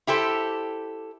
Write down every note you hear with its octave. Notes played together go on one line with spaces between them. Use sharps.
E4 G4 A4 C5